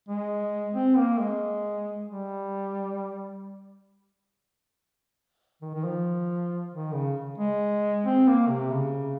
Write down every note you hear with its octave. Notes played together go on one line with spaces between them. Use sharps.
G#3
C4
A#3
G#3
G3
D#3
D#3
F3
D#3
C#3
G#3
C4
A#3
C3
C#3